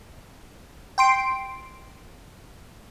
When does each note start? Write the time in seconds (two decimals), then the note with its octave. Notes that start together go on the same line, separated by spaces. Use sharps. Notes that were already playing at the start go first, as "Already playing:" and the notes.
0.98 G5 C6 D7